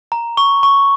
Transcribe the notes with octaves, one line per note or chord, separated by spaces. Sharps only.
A#5
C#6
C#6